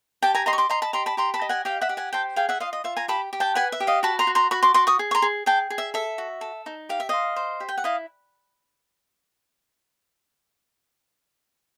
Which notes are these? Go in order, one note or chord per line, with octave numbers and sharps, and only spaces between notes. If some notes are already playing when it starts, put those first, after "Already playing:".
G4 G5 A5
G#5 A#5
D#5 A#5 C6
C#6
C6 D6
D#5 A#5 C6
A5 B5
G4 A#5 C6
A5 B5
G4 A#5 C6
A5 B5
D#5
F#5 G#5
G4 F5 G5
E5 F#5
G4
F#5 G#5
C5 G5 A5
G#4 F5 G5
E5 F#5
F4 D#5 F5
D#5
F4 E5
G#5 A#5
G4 A5 B5
G4
G5 A5
B4 F#5 G#5
E5
G4
D#5 F5
F#4 A5 B5
A#5 C6
F#4
A#5 C6
F#4 B5 C#6
C6 D6
F#4 C6 D6
C#6 D#6
G#4
C#6
A#5 C6
G#4
G#4 G5 A5
G#4
E5
A4 E5
F#4
A4
D#4
G4 F5
E5
C5 D#5 F5
C5
G4
G5
F#5
E4 D#5 F5